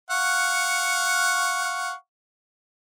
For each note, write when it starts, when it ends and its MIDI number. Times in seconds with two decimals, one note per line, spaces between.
0.11 1.93 77
0.11 1.93 78
0.11 1.93 85